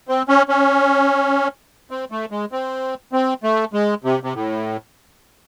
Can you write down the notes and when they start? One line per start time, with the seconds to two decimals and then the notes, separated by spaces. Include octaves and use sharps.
0.08 C4
0.29 C#4
0.49 C#4
1.91 C4
2.11 A3
2.31 G#3
2.52 C4
3.13 C4
3.43 A3
3.73 G#3
4.04 C3
4.23 C3
4.34 A2